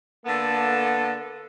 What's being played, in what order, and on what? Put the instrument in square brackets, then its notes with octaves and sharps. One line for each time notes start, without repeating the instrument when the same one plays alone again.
[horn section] D3 A#3 B3 A4